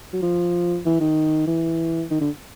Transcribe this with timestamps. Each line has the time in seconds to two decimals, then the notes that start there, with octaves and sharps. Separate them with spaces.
0.13 F#3
0.22 F3
0.85 E3
1.00 D#3
1.47 E3
2.11 D#3
2.20 D3